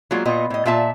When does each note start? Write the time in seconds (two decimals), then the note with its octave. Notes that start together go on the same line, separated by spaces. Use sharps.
0.11 F#3 G#3 A#3 F4
0.25 A#2 B3 F4 D#5
0.50 A2 D#5
0.65 A#2 F4 E5 A5